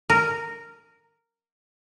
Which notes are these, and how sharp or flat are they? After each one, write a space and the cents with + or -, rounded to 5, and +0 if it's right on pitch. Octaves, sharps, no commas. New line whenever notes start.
A#4 -10